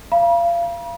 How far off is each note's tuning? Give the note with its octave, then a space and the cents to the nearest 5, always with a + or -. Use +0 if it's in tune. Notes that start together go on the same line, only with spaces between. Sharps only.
F5 -30 B5 -45